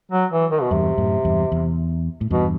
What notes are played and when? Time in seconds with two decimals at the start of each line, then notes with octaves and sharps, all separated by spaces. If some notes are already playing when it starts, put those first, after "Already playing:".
0.12 F#3
0.32 E3
0.51 D#3
0.62 B2
0.71 E2 G2 C3
0.98 F#2 A2
1.25 E2 G2
1.52 E2
2.21 A2
2.31 E2 G2 B2